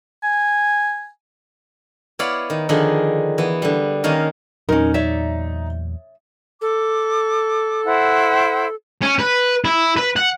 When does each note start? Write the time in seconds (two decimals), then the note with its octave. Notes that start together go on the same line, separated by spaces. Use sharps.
0.23 G#5
2.19 B3 E4 C#5 D5 F5 B5
2.50 D#3
2.69 D3 D#3 F3 G#4
3.38 E3 B3
3.62 D3 G3
4.04 D#3 A#3 C#4 F5 G#5
4.69 E2 A#2 F#3 C#4 D#4 A#4
4.94 C#5 D5 E5
6.61 A4 D6
7.84 E4 C5 F#5
9.02 C#4
9.19 B4
9.65 E4
9.97 B4
10.16 F#5